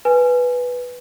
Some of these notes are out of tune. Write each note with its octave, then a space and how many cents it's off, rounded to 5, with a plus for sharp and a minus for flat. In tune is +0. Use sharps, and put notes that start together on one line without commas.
B4 +0 G#5 +0